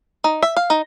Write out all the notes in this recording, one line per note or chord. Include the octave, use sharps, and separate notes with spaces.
D#4
E5
F5
D#4